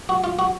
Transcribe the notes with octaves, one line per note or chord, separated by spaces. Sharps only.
F#4
F4
F#4